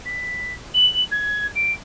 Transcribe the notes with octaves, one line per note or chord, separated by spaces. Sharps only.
B6
F#7
G#6
D7